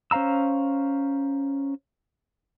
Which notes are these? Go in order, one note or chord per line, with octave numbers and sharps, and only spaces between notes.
C#4 C5 F5 A#5 E6